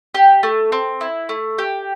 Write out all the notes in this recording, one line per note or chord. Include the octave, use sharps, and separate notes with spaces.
G4
A3
C4
E4
A3
G4